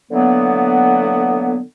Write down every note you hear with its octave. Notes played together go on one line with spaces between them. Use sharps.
D3 E3 F#3 A#3 B3